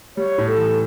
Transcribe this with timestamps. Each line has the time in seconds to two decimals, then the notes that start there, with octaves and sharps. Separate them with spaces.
0.17 G3 C#5
0.38 A2
0.47 A4
0.57 E3